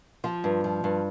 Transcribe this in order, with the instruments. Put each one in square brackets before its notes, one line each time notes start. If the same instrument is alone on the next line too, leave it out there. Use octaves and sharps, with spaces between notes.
[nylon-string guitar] F3 F4
G2
F3
G2